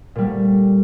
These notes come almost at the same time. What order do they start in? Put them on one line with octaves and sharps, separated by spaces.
A#2 G3 A3